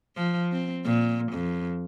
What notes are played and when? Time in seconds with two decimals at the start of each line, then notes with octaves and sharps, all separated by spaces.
0.16 F3
0.52 C4
0.85 A#2
1.32 F2